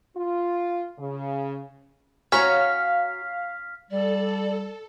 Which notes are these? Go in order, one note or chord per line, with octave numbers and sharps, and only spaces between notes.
F4
C#3
C#4 F#4 C#5 F5 A#5 F6 B6
G3 A4 D5